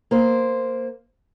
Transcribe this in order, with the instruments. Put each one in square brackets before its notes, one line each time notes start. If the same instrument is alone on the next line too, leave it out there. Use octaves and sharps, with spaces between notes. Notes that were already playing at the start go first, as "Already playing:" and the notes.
[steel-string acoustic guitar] A#3 C5